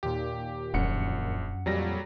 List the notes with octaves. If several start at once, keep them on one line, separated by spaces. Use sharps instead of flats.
D#2 A#2 G4
E1 A#1 F#2 F#5 C#7
F2 A#2 F#3 G3 A#6